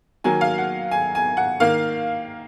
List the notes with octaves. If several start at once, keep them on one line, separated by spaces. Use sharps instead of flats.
D#3 F#3 A#3 G#5
F5
F#5
G#5
G#5
F#5
D#3 A#3 F5